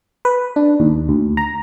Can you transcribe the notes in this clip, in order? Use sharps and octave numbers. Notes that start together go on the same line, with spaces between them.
B4
D4
D#2
D2
A#5